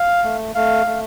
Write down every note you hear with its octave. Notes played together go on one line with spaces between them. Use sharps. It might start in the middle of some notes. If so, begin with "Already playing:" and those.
Already playing: F5
A3
A3 F5
A3